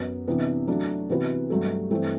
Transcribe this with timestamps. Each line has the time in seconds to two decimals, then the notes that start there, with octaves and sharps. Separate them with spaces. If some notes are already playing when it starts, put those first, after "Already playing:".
Already playing: F#2 F#3 B3
0.27 C3 E3 B3 D4
0.67 F#3 A3 D4
1.09 C3 E3 B3 F#4 B4
1.50 G2 F#3 A3
1.91 G2 E3 A3 C4